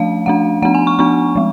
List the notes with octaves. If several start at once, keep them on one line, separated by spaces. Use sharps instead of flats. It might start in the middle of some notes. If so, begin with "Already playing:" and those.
Already playing: F3 A3 D4 F5
F3 A3 D4 F#5
F3 B3 D4 F#5
G#5
C#6
F3 B3 D4 C#6
F3 G#3